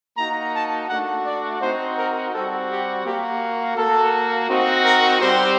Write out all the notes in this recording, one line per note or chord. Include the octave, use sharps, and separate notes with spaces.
A#3 D#4 F#4 A#5
A5
A3 D4 F#4 F#5
D5
C4 D#4 F#4 C5
A#4
G3 C4 F#4 A4
G4
A#3 F#4 G4
A#3 F#4 A4
C4 D#4 F#4
A#4
G3 C4 G4 C5